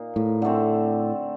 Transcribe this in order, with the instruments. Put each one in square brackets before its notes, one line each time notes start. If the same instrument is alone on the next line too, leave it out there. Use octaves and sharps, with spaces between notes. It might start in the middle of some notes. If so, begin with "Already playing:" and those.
Already playing: [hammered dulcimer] A#2 A#3 D#4
[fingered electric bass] A2
[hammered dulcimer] D3 A3 C4